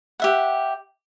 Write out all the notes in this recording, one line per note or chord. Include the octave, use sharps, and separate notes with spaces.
G4 E5 F#5